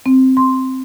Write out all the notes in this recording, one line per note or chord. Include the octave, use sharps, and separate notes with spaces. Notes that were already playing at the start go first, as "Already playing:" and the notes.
C4
C6